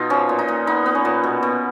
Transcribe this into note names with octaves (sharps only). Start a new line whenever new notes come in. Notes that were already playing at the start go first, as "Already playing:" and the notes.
Already playing: B2 D#4 F4
F3 C#4
A#2
D#4
A#2
B3 D#4
B3
C#4
A#2
B2
B2